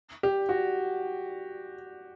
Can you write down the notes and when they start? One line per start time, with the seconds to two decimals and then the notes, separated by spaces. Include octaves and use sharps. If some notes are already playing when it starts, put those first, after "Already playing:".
0.23 G4
0.49 F#4